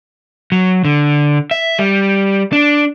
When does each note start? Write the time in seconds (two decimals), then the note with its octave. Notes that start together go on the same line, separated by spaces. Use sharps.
0.52 F#3
0.85 D3
1.51 E5
1.78 G3
2.53 D4